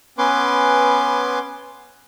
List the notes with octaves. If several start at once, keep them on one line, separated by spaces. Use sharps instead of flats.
B3 C#4 B4 G#5 C6 D6